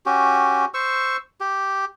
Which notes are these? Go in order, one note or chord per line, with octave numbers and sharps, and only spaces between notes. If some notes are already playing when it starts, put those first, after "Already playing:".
C#4 F#4 G4
C5 C#6 E6
G4